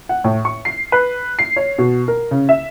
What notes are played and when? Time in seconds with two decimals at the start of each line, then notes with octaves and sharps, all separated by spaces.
0.09 F#5
0.24 A2
0.45 C#6
0.65 C7
0.92 B4
1.39 C7
1.56 C#5
1.78 B2
2.08 A#4
2.31 C#3
2.49 E5